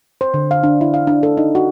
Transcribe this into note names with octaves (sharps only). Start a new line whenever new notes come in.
C5
D3
F5
D4
E4
F5
D4
A4
D#4
F#4